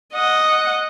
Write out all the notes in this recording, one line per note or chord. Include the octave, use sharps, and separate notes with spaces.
D#5 F#5